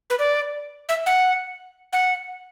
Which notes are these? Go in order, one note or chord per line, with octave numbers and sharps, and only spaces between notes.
B4
D5
E5
F#5
F#5